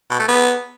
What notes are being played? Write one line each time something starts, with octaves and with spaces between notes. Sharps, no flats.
B2
A3
B3